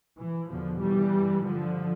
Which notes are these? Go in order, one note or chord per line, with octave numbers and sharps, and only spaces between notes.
E3
E2 B2 D3 F3
E3 G3
G2
D3 F3